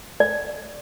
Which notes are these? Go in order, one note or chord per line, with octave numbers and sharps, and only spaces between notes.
D5